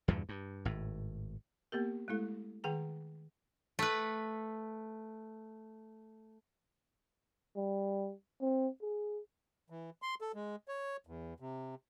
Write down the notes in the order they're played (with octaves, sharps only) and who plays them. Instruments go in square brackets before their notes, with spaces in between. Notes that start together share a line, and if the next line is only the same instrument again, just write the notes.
[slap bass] E2 G2 A#2 D3
G2
G#1 A2
[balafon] A#3 B3 G4 A#4
G#3 A3 E4 A4
D#3 G#4 F#5 G5 A#5
[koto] A3 B4
[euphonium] G3
C4
G#4
[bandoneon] E3
C6
A4
G#3
C#5
E2
C3